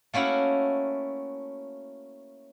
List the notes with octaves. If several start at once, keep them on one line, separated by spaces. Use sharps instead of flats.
A3 A#3 C#4 E4 F#4